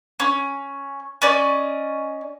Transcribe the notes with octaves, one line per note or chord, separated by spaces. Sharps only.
C#4
C#4 D5 D#5